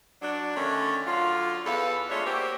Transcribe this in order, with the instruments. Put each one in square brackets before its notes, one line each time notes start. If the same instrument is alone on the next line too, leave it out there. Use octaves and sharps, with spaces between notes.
[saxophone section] F#3 D4
D3 D#3 A3 C#4
D3 F#3 F4
E2 A4 B4 F5
G#3 A3 D4 F4 C#5
A#3 C4 F#4 G4